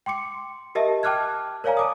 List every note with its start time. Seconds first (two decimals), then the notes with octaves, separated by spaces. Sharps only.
0.06 G5 C6 D6 C#7
0.75 G4 A#4 D#5 E5 A5
1.03 G5 A5 D6 F6 F#6 G#6
1.64 A#4 C#5 D5 F5 G#5 A#5
1.77 A5 D6 D#6